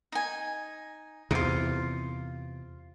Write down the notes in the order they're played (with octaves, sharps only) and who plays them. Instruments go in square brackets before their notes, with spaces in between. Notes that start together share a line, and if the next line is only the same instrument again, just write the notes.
[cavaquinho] D#4 G#5
[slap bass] E2 C3 [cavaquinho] D#4 F4